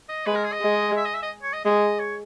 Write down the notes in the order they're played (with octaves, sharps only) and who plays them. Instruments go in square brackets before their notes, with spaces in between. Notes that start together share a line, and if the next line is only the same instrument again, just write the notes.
[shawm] D#5
[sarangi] G#3 [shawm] B4
[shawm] A#4
G#4
D#5
[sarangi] G#3
[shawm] E5
D#5
E5
D#5
C#5
D#5
[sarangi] G#3 [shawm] D#5
[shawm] C#5